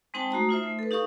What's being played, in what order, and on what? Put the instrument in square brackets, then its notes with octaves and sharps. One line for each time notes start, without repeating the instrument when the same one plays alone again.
[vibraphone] G#3 C4 D#4 C5 G5 A5
A3 F#4 A#5 D#6
D#4 F4 C5 E5
A3
A4 B4
D#4 G4 F5 C#6 D#6